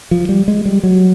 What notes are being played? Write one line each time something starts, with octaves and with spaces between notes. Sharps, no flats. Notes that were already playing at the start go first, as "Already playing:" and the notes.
F3
G3
G#3
G3
F#3